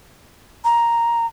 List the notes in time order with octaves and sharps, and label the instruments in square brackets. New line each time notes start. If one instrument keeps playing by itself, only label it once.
[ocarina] A#5